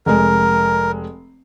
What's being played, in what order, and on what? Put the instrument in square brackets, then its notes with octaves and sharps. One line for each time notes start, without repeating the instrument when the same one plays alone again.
[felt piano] F1 G#3 [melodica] A#4